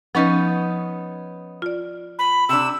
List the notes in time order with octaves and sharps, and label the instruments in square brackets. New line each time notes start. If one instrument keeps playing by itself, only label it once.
[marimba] F3 B4 A6 [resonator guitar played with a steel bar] B3 C#4 D#4
[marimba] F4 D5
[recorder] B5
[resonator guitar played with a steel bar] C3 D4 [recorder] E6